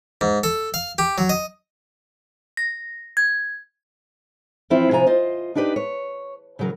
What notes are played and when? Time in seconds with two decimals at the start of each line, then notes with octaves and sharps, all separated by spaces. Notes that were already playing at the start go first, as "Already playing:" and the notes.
0.21 G#2
0.44 A4
0.74 F5
0.98 G4
1.18 F#3
1.29 D#5
2.57 A#6
3.17 G#6
4.70 E3 F3 C4 E4 F4
4.91 C3 F3 C5 G#5 A#5
5.06 F4 C5 D#5
5.55 D4 D#4 G4 B4 D5
5.76 C#5
6.59 C#3 E3 F#3 A#4